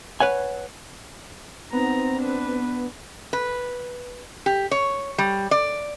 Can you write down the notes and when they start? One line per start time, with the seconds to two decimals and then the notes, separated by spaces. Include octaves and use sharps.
0.20 B4 C#5 F#5 G#5
1.72 B3 C4 D#4 A#5
2.18 D4 B4
3.33 B4
4.46 G4
4.71 C#5
5.18 G3
5.51 D5